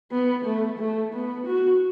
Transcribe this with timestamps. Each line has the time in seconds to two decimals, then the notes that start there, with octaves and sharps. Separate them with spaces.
0.12 B3
0.45 A3
0.79 A3
1.14 B3
1.47 F#4